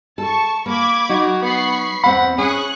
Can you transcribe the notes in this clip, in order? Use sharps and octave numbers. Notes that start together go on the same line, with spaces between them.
A4 A5 C#6
A#3 B5 D6 G#6
F#3 D#4 F#4
B3 B5 C#6 C7
E2 C4 F#5 B5
C#4 G#4 C#6 F#6